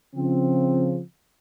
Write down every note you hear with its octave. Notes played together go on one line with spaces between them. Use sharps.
C#3 F3 C4